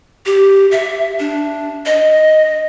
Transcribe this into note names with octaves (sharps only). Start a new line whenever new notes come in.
G4
E5
D4
D#5